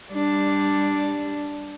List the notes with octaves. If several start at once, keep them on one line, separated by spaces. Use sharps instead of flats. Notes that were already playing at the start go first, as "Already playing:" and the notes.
G3 D4